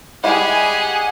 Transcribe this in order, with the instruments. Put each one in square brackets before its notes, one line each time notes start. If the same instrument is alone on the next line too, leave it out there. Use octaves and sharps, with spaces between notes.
[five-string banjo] G3 G#3 E4 [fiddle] G4 G#4 [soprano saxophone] F#5 [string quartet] G#5